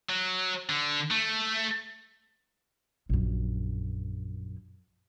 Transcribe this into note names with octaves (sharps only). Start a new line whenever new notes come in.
F#3
D3
A3
A#1 F#2